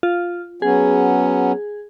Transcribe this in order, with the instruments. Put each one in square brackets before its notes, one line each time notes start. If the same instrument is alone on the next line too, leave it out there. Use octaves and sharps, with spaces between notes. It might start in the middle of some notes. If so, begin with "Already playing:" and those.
[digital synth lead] F4
[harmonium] F#3 B3 C#4 [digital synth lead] G#4